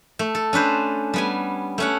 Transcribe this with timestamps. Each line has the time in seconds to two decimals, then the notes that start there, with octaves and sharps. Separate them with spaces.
0.19 A3
0.35 A4
0.53 C#4 D4 B4 C5
1.14 G3 B3 G#5
1.78 A3 C#4 F#5